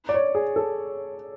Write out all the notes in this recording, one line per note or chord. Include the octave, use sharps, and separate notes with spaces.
D5
C#5
G#4
A4